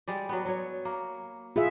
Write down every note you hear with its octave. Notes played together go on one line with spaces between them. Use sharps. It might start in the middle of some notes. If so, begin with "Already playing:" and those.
G3 G#3 D5
F#3 B3
F#3 C#5
A#3
B3 F4 G#4 E5